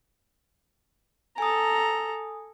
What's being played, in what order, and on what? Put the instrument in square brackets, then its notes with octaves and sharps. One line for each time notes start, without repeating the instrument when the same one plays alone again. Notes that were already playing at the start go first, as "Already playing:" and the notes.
[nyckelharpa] A4 A#5 [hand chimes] G#5 D#6